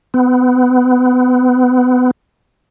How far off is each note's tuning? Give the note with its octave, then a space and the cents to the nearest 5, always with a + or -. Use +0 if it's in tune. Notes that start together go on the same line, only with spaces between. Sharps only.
B3 +30